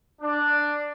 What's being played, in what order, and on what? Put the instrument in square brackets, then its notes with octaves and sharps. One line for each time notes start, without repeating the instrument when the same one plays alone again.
[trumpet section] D4